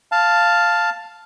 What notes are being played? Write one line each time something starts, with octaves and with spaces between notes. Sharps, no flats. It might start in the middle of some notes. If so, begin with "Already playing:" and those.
F5 A5